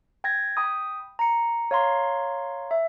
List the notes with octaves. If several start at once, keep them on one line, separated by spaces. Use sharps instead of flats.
G5 G#6 A#6
G5 B5 D#6
A#5 C#7
C#5 F5 A#5 C6
E5